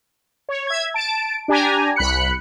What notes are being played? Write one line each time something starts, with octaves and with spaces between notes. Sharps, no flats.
C#5
E5 G#6
A5 D7
D4 G4 G#5 A#5
C2 B5 F#6 C#7